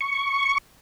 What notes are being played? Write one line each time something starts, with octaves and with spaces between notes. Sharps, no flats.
C#6